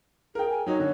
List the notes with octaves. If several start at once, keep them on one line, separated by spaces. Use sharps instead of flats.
G#4 A#4 G5
G#5
F#3 D#4 C#5
D3